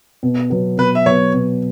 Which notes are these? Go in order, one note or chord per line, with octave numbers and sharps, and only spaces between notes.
B2
F#3 B3
B2 B4
E5
F#3 B3 C#5
B2